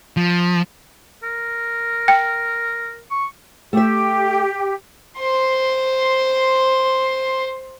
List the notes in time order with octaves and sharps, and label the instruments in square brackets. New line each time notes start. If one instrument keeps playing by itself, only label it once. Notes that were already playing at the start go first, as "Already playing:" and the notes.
[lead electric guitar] F3
[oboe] A#4
[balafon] G5
[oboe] C#6
[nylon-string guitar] A3 E5 [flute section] G4
[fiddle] C5 C6